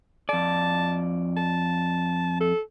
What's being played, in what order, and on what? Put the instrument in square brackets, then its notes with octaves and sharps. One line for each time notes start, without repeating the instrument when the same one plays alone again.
[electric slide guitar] F2 D5 [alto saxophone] A5
[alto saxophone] A5
A4